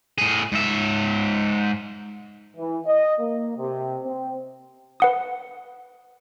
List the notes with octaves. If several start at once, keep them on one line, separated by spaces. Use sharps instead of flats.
A2 G#4
G#2 E5
E3
D#5
A#3
C3
C4
B4 F#5 D#6